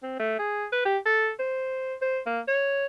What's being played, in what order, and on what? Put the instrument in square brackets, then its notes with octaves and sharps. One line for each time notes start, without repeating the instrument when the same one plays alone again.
[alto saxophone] C4
A3
G#4
B4
G4
A4
C5
C5
A#3
C#5